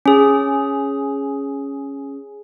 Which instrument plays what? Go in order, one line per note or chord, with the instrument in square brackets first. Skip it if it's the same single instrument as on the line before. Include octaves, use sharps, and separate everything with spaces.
[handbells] C#4 G#4